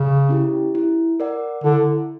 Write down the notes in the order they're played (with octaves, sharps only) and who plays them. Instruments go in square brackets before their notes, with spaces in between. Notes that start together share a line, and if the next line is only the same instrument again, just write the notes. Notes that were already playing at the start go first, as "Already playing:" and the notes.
Already playing: [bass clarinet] C#3
[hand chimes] C#4 E4 G4
E4
A#4 D5 F#5
[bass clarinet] D3 [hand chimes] E4